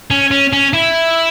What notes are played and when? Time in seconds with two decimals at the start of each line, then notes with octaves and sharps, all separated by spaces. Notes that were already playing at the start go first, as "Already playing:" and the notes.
0.10 C#4
0.31 C#4
0.52 C#4
0.73 E4